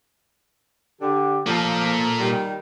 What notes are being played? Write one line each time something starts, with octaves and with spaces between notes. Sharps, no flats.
D3 G4
A#2 F3 A#3 A4
D#3 G3